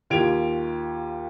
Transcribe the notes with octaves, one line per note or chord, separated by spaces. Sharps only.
D#2 F4 G4 G#6 D7 F7